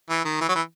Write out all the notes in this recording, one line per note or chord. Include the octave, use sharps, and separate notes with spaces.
E3
D#3
E3
F#3
E3